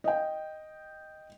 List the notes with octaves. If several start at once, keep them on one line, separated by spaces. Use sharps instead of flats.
D#5 G5